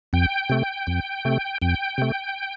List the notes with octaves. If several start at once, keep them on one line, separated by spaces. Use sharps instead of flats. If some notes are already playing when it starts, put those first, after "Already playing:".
F2 G5
C3 A3
F2
C3 A3
F2 G5
C3 A3